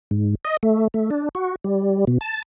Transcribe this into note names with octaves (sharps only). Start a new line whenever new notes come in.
G#2
D#5
A3
A3
D4
F#4
G3
B2
A5